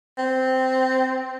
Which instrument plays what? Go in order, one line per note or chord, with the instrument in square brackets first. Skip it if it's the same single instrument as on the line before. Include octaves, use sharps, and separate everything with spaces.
[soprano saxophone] C4